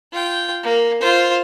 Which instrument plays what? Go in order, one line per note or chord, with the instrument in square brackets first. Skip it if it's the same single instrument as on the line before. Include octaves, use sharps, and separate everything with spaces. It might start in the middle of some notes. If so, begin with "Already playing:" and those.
[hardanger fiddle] F4 G5
A#3
F4 C5